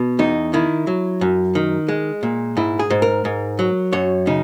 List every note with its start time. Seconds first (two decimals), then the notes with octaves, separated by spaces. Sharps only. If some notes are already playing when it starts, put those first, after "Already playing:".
Already playing: B2
0.19 E2 D#4
0.54 D#3 E4
0.87 F#3
1.21 F#2
1.55 D#3
1.88 G#3
2.23 A#2
2.57 G#2 E4
2.79 G#4
2.90 G#2
3.02 A#4
3.25 G#2
3.59 F#3
3.93 F#2 C#5
4.27 C#3 D#4